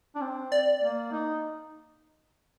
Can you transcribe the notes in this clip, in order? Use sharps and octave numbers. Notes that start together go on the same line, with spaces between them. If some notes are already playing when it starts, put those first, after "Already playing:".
D4
C4
D5
A#3
D#4